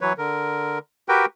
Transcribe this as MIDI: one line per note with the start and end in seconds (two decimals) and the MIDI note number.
0.01 0.13 52
0.01 0.13 54
0.01 0.13 71
0.01 0.13 73
0.18 0.79 50
0.18 0.79 70
1.09 1.26 66
1.09 1.26 67
1.09 1.26 70
1.09 1.26 71
1.09 1.26 79